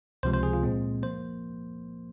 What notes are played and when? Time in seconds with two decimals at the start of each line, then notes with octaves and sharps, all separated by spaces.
0.23 C#2 C3 F3 G#3 C5
0.34 C5
0.43 G#4
0.54 F4
0.63 A#2 G#3 C4
1.03 F3 A#3 C5